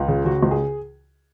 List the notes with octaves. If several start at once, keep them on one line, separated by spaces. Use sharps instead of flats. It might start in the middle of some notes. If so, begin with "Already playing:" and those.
Already playing: C#2 F4
C#3
C#3 F#4
C#2
G#4